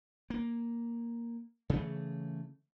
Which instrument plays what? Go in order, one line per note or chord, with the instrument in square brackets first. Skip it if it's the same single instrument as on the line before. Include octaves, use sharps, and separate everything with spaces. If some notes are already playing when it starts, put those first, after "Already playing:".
[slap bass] A#3
C#3 E3 A3